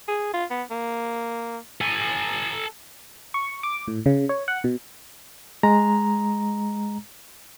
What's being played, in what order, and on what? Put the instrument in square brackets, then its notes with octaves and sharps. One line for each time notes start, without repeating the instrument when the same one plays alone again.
[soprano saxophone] G#4
F4
B3
A#3
[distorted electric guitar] A4 G#5
[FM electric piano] C#6
D6
A2
C#3
C#5
F#5
B2
[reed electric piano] G#3 A#5